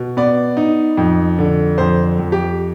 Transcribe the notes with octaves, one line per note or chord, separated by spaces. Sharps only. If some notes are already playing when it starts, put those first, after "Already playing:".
Already playing: B2
B3 D5
D#4
F2
D3
F2 C5
F2
G4